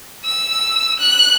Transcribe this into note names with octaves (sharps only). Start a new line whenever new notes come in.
E6
F#6